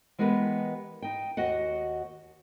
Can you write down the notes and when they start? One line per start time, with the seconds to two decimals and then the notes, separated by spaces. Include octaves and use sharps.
0.18 E3 G#3 B3 G4 A#4 B4
1.02 D#4 G5
1.37 D#2 F#4 D#5 F#5